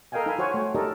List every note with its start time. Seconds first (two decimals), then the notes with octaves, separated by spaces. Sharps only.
0.12 A4 A#4 D#5 F5 G5 G#5
0.26 D#4 A#4 F5 G#5 B5
0.39 F#4 C5 C#5 F#5 G#5
0.54 A3 C#5 G5 G#5
0.75 D#4 G4 A4 A#4 D5 D#5